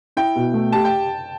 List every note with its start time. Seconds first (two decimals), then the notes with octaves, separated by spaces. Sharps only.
0.17 E4 G5
0.36 B2
0.54 A3
0.72 G4 A5
0.85 G5